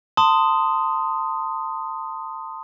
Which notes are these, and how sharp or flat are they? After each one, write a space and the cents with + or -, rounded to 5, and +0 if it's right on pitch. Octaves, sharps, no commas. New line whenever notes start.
A5 +30 C6 -15 D#6 +0